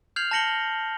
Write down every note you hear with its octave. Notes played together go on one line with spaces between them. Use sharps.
F6 G6 G#6 C7 F7 F#7
A5 G6 A#6 C#7 F#7 G7